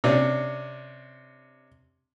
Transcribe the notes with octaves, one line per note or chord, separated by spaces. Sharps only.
C3 C#4 D4